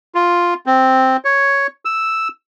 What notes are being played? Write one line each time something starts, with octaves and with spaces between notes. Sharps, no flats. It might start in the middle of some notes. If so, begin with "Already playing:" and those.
F4
C4
C#5
E6